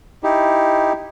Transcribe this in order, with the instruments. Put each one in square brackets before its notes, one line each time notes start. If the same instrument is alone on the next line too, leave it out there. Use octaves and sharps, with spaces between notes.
[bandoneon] D#4 E4 G4